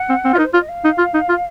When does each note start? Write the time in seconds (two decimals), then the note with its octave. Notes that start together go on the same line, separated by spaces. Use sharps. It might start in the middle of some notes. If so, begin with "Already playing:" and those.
Already playing: F#5
0.09 C4
0.25 C4
0.33 F4
0.36 D#4 A#4
0.44 C5
0.53 F4 C#5
0.60 D#5
0.68 F5
0.84 D#4
0.98 F4
1.14 D#4
1.29 F4